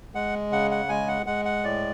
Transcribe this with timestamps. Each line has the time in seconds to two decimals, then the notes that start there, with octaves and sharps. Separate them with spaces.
0.14 G#3 F#5
0.51 C#3 F#5
0.71 F#5
0.89 G#3 G#5
1.08 F#5
1.26 G#3 F#5
1.45 F#5
1.64 A2 D5